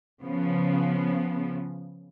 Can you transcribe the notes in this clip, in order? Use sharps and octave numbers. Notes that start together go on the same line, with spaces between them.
C#3 F3 B3